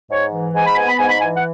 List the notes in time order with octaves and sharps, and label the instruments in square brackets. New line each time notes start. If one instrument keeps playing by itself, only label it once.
[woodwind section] G#2 C#5
E3
G#2 G#5
B5
B3 G#5
B5
G#2 G#5
B5
E3 G#5
F#5